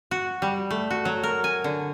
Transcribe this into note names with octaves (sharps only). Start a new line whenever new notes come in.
F#4
G3
A3
F#4
F#3
A#4
G#5
D3